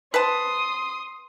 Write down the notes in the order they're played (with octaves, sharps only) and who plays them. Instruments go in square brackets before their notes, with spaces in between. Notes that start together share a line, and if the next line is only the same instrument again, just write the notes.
[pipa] B4 C5 A5 [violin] C6 D#6